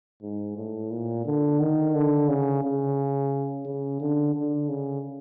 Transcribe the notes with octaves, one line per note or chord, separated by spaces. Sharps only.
G#2
A2
A#2
D3
D#3
D3
C#3
C#3
C#3
D3
D3
C#3